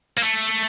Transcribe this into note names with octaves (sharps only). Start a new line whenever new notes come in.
A#3
A3